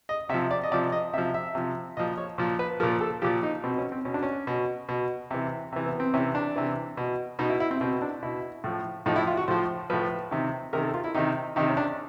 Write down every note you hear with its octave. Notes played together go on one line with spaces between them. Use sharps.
D#5
C3 F3 E5
D5
D#5
C3 F3 D5
D#5
C3 F3 E5
E5
C3 F3
A#2 F3 D#5
C#5
A#2 F3 C5
B4
A#2 F3 A#4
A4
A#2 F3 G4
D#4
B2 C4
C#4
C4
B2 C#4
D4
C#4
B2
B2
C3 E3
C3 E3
B3
C4
C3 E3 C#4
D4
C3 E3
B2
B2 D#4
E4
E4
C4
B2 C4
D4
B2 E4
A2 F3
A2 F3 D#4
E4
F4
F#4
A2 F3 C5
A2 F3 B4
C3 D#3
C3 D#3 A#4
A4
F4
E4
C3 D#3 D#4
C3 D#3 D#4
C#4
D4